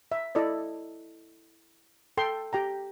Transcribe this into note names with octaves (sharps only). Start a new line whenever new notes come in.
E5
E4 A4 D5 D#5
A4 G5 C6
G4 G5 A#5